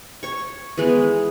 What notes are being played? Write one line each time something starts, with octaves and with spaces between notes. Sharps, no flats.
C#5 C#6
E3 G#3 B3